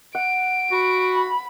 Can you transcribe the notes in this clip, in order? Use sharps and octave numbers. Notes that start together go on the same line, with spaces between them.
F#5 D7
F#4 B5